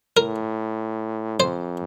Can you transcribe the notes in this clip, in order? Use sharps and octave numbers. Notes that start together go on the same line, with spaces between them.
A2 A#4
F2 C5